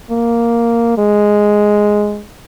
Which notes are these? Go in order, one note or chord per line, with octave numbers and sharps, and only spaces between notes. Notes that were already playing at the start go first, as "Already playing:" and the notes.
A#3
G#3